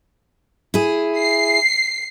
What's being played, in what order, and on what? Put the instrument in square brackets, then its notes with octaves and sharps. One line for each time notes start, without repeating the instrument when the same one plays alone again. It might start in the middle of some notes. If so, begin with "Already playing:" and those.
[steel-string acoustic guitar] E4 G#4
[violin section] C7